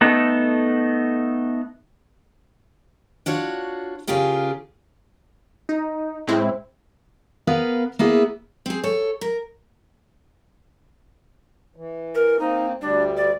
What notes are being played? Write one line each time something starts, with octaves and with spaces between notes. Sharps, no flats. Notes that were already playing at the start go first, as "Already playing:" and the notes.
A3 B3 D#4 A4
D4 F4 F#4 C#5
C#3 C#4 F4 G4 G#4 A#4
D#4
A2 G#3 C4 E4
B3 A#4 B4 F5
A#3 B3 E4 G#4
C4 G#4
A4 C#5
A#4
E3
A#4
A#3 C4 D#4
D2 G3 D4
D5